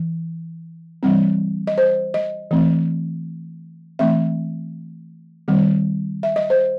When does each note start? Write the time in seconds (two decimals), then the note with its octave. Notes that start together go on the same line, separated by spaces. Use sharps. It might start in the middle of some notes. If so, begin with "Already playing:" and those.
Already playing: E3
1.03 E3 G3 C4
1.67 D#5
1.78 C5
2.14 D#5
2.51 E3 A3 C4
3.99 E3 A3 C4 E5
5.48 D#3 G3 C4
6.23 E5
6.36 D#5
6.50 C5